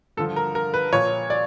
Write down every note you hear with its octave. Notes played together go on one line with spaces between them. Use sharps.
G2 D3 F3 A4
A#4
A#4
B4
A#2 F3 C#5
D5